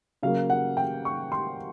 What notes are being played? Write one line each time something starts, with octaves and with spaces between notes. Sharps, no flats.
C#3 F#3 A#3 F5
F#5
G5
C#6
C6